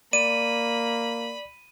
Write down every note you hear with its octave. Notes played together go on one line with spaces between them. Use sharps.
A#3 D5 B5 D#7